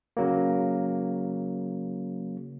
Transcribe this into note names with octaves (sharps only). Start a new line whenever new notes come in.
C#3 F#3 A#3